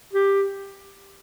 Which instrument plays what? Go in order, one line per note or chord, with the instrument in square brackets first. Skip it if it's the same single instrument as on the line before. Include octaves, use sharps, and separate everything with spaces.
[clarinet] G4